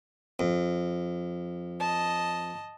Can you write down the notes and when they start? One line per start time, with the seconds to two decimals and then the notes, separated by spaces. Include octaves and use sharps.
0.39 F2
1.81 D#5 A5